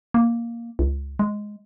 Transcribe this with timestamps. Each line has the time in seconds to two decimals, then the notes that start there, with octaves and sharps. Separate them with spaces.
0.14 A#3
0.79 C#2
1.19 G#3